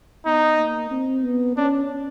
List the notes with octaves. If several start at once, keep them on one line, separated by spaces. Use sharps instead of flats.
B3 D#4
A#3
C4
B3
C#4 D4